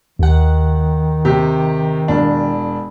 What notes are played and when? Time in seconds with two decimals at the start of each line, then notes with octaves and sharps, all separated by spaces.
0.19 D#2 D#3 F#5
1.25 C3 G4
2.08 E1 D4